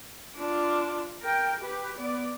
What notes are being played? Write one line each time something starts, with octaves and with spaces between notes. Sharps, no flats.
D4 F4
A#4 G5
G4 B4
B3 D5